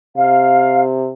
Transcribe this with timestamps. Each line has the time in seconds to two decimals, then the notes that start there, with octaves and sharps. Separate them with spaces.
0.16 C3 F5